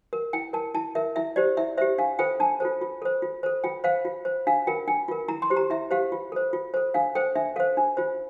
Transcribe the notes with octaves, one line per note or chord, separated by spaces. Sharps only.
A#4
E4 G5
A#4 A5
E4 A5
A#4 E5
E4 E5
G4 C5 D5
E4 E5
G4 C5 E5
D4 F5
F4 A4 C5 G5
D4 A5
F4 A4 C5
F4
A4 C5
F4
A4 C5
F4 G5
C5 F5
F4
C5
D4 F5
F4 A#4 G5
D4 G5
F4 A#4
E4 A#5
C6
G4 C5
A#5
E4 E5
G4 C5 F5
F4
A4 C5
F4
A4 C5
D4 F5
A4 C5 G5
D4 E5
A4 C5 F5
D4
F4 C5